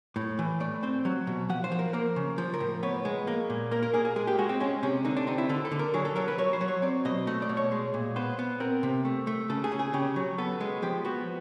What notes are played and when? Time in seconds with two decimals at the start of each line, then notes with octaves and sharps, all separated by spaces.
0.16 A2
0.39 E3
0.60 A3 D5
0.83 C4 C5
1.05 F#3
1.27 B2
1.49 F3 F#5
1.64 C5
1.72 F3
1.79 A#4
1.93 A#3 A#4
2.16 C#3
2.38 F3
2.54 A#4
2.60 A2
2.83 B3 C#5
3.05 G#3
3.27 A#3
3.50 A#2
3.71 A#3 A#4
3.83 A#4
3.94 A#3 G#4
4.05 G#4
4.16 G#3 G#4
4.27 G4
4.38 G#3 F#4
4.49 C4
4.60 G#3 C#4
4.83 C3 C#4
5.05 D3 D#4
5.17 D4
5.27 C4 D#4
5.38 E4
5.49 D3 A4
5.65 A4
5.72 D3
5.79 A#4
5.94 F#3 G#4
6.05 A4
6.16 F#3 A#4
6.28 B4
6.38 F#3 C#5
6.53 C5
6.61 F#3
6.68 C#5
6.82 C4 D5
7.05 B2 D#5
7.27 A3 D#5
7.42 D5
7.49 B2
7.57 C#5
7.72 G#3
7.94 A#2
8.16 B3 C5
8.39 B3
8.60 C4 A#4
8.83 C3
9.05 A3
9.27 A3
9.50 C#3 A4
9.64 G#4
9.72 C#3
9.79 G#4
9.94 C#3 G4
10.16 F#3
10.38 B3 A4
10.60 G#3
10.82 F3 G4
11.05 B3 F#4